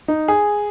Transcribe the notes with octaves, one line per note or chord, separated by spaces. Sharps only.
D#4
G#4